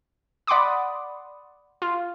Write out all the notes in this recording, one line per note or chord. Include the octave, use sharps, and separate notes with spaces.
D5 F#5 B5 C6 D6 D#6
F4